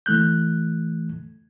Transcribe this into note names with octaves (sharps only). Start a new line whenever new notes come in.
E3 A3 F#6 G6